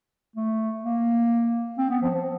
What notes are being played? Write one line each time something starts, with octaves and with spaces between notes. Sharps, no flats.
A3
A#3
C4
B3
F3
F3